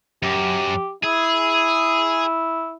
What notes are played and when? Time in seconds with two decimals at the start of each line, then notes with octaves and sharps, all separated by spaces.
0.23 F#2 G4
1.04 E4 G#4